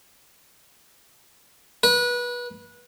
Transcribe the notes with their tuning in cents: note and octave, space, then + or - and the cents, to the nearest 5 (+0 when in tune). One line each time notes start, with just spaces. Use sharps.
B4 -25